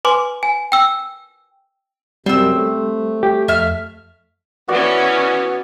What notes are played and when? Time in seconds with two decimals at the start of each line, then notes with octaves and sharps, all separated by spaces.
0.05 B4 G#5 C6 D6
0.43 G#5
0.72 G5 E6
2.26 F#2 C3 G3 C4 E6
2.52 A3
3.23 G4
3.48 F2 E5 F5 F6
4.68 E3 B3 C#4 F#4 D5